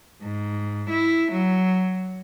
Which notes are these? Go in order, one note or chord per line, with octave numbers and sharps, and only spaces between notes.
G#2
E4
F#3